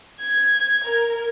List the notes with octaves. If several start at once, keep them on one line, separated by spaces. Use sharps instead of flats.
G#6
A#4